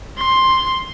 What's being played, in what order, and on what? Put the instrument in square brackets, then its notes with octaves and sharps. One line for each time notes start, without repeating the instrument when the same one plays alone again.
[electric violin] C6